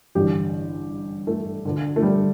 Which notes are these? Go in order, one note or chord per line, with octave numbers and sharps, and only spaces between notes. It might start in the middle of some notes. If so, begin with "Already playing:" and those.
A1 G2 D3 G4
A3
D2 D3
A3
G3